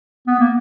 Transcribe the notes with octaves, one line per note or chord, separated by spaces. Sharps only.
B3
A#3